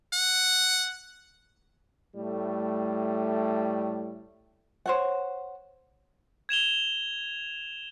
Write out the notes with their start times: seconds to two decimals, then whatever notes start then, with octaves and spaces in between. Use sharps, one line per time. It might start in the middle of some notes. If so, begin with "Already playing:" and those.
0.13 F#5
2.15 A2 G3 A3
4.86 C5 C#5 F#5
6.49 G#6 E7 F7 G7